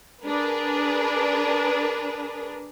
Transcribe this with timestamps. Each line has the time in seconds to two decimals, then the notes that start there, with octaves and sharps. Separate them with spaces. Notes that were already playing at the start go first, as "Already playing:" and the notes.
0.23 D4 G#4 A#4 B4